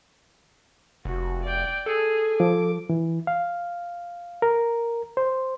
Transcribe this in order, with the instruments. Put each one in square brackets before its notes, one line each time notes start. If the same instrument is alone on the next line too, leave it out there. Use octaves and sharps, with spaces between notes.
[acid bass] F1 [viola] F#4
[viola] D5 G5
[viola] G#4 [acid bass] A4
[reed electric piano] F3 [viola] D6
[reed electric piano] E3
F5
A#4
C5